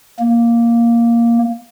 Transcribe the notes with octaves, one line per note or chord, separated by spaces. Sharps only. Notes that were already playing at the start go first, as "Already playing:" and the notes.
A#3